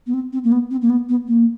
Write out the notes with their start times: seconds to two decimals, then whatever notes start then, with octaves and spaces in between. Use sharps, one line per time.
0.06 B3
0.13 C4
0.32 C4
0.44 A#3
0.52 B3
0.70 C4
0.81 A#3
0.89 B3
1.09 B3
1.28 A#3